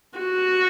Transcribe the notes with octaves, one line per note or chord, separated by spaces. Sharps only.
F#4